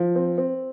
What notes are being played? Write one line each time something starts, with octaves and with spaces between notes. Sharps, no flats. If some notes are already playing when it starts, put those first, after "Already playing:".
Already playing: F3
C4
C4